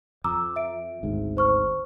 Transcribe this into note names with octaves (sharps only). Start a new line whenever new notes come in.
F2 A#5 D6 E6
E5 D7
G#1 D2 G#2
C5 C#6 F6